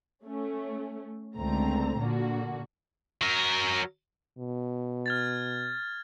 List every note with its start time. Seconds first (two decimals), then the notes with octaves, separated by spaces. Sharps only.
0.24 A3 C#4
1.37 C#2 D3 A3 C4 A#5
1.98 A#2 D3 A#3 F#4
3.21 F#3 A#4
4.38 B2
5.06 F6 G#6 A6